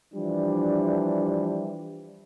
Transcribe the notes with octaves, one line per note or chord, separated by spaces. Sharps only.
E3 F3 G3 D4